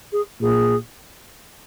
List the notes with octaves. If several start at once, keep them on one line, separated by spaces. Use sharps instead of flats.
G#4
A#2 G#4